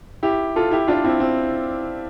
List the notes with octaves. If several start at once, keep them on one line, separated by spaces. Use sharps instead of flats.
E4 G4
F4 A4
E4 G4
D4 F4
C4 E4
C4